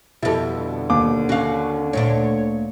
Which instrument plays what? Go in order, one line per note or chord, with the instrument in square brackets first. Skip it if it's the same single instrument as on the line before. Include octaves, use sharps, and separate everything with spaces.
[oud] F2 G3 [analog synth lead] B2 [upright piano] E4 A4
[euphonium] D3
[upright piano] D#2 D6
[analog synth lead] C#4 [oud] F#4 F5
[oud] D2 A#2 D4 [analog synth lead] C#5